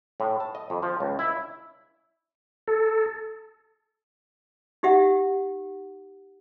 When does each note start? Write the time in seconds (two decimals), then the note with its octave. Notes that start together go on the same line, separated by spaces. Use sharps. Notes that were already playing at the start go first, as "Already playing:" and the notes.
0.20 A2
0.40 A5
0.55 D#5
0.70 F2
0.83 F3
1.00 C#2
1.19 E4
2.68 A4
4.83 D#4 G4 E5 F#5